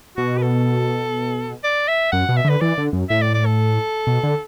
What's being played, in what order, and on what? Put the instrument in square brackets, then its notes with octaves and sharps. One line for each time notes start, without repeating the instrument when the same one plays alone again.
[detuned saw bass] B2 [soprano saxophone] F#4
[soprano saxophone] B4
A4
D5
E5
[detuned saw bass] F#2 [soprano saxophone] F#5
[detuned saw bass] B2
[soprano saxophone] E5
[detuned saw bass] D3 [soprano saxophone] B4
[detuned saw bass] E3 [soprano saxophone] D5
[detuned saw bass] D3
F#2
[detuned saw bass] A2 [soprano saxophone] E5
[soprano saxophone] D5
D5
A4
[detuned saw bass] B2
D3